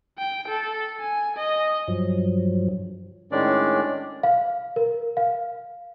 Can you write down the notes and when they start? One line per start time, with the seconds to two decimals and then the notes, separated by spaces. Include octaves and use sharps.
0.18 G5
0.48 A4
1.00 G#5
1.37 D#5
1.88 G2 F3 F#3
3.32 A2 D#3 G#3 C#4 D4 D5
4.23 F5
4.76 A#4
5.17 F5